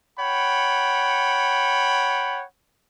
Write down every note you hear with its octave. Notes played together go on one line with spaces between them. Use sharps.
C#5 F#5 G5 B5